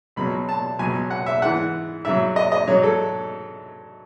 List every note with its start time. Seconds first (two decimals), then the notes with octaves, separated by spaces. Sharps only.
0.16 C#2 B2 F#3 B5
0.49 A5
0.79 C#2 B2 F#3 G#5
1.10 F#5
1.26 E5
1.42 G#2 E3 F#5
2.05 G#2 F#3 E5
2.36 D#5
2.52 D#5
2.68 G#2 F#3 C#5
2.83 A4